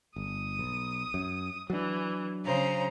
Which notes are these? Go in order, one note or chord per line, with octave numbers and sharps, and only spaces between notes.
G1 D#6
B1
F#2
E3 F#3 D4
C#3 C5 A#5